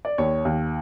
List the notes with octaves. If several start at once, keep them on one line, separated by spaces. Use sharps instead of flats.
D5
D#2 C#5
D#2